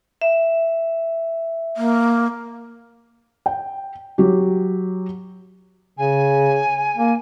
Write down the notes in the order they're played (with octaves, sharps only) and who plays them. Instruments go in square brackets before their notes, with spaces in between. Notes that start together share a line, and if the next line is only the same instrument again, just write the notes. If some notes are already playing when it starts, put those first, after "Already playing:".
[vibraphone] E5
[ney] A#3
[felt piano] G5
F#3 G4
[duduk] C#3 [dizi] G#5
[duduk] A#3